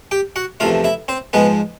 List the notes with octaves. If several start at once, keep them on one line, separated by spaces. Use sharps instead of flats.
G4 G5
F#4 F#5
E2 C3 F3 A3 F4 F5
E4 E5
C4 C5
G#2 F3 G#3 B3 B4